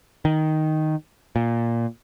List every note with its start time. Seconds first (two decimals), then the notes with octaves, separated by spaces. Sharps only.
0.25 D#3
1.36 A#2